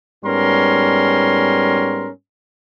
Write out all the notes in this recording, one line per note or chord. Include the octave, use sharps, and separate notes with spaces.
G#2 G3 B3 C#4 A#4 C6